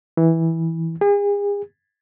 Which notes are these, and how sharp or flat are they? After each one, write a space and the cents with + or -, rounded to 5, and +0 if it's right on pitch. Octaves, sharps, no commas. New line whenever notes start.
E3 -10
G#4 -40